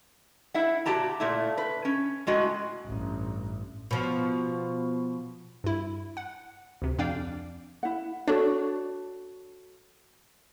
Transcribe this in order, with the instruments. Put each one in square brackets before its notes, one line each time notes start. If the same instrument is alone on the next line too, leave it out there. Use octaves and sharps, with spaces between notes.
[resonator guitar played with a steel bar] E4 E5 F#5
A#2 F#4 G4 A5 A#5
A#2 A3 E4
B4
C#4
A2 G#3 F#4 G#5
[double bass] A1 G2
[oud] B2 F3
[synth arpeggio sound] G2 E4
F#5
D2 C3
F2 D4 D5 F5 G5
[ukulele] E4 F#5
[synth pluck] D4 [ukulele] F#4 A4 C#5